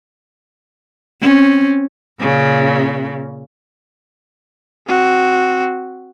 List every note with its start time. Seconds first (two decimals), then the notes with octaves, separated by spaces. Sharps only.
1.22 C4 C#4
2.21 A#2 C#3
4.87 C4 F#4